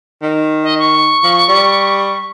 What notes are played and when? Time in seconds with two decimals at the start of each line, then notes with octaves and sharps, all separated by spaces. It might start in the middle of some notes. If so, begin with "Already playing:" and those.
0.22 D#3
0.63 D#5
0.79 C#6
1.23 F3
1.49 G3